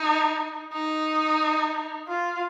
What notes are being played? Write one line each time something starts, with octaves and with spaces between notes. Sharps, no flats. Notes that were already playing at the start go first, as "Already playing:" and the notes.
Already playing: D#4
D#4
F4